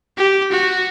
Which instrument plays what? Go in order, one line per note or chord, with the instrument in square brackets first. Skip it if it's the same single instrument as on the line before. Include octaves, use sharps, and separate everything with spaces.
[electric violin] G4
F#4